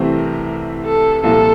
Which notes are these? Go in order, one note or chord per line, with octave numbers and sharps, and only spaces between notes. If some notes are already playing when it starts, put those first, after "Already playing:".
Already playing: C2 C3 E3 A3 C4
A#4
A4
C2 A#2 F3 A4